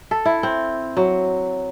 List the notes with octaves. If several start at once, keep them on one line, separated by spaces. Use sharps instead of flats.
A4
E4
C4
F#3